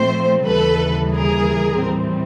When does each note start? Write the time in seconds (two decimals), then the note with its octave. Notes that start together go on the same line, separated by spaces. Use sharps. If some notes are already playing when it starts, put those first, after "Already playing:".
Already playing: A#2 F3 A3 C4 C5
0.46 D#2 C#3 E3 G3 A4 B4
1.14 G#4 A#4
1.82 A2 E3 G3 C4